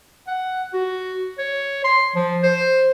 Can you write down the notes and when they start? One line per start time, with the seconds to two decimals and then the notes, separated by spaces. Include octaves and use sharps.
0.28 F#5
0.74 F#4
1.38 C#5
1.84 C6
2.15 F3
2.43 C5